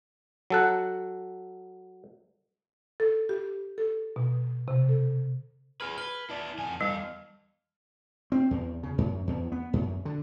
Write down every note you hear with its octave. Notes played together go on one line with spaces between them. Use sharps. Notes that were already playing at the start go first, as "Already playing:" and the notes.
F#3 A4 F#5
A4
G4
A4
B2
C3
A4
G#4 B4 F6 G#6
B4 F6 G7
E4 D5 A5
F2 G#5
E2 G3 F5
C4
E2
C#3
F#2
E2
B3
F#2
D3